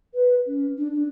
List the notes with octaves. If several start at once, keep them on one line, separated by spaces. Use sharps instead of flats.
B4
C#4
D4
D4